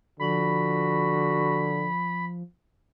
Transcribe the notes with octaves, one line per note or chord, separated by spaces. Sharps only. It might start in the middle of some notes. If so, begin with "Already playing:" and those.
D3 F3 F#4 B5